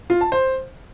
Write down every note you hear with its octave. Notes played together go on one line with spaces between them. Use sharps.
F4
A5
C5